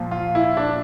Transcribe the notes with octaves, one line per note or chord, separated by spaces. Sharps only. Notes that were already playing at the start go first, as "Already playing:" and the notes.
Already playing: A#2 F3
F4
E4
D4